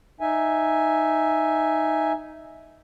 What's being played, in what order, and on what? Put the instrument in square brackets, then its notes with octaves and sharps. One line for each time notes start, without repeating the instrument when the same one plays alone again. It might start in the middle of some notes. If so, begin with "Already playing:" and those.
[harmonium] D#4 E5 G#5